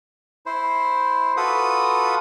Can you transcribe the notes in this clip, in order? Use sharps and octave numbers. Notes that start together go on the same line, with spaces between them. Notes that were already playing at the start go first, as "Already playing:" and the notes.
E4 C5
F4 F#4 A4 B4 D#6